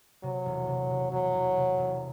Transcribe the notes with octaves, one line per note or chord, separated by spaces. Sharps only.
C3 F#3
E1
C3
C3
E1 F#3
E1
C3
E1